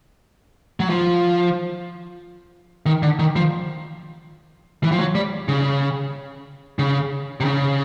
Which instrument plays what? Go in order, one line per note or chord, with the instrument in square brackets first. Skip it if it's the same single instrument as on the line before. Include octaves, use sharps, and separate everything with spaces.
[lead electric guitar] F#3
F3
D#3
D3
D#3
F3
E3
F3
F#3
G3
C#3
C#3
C3
C#3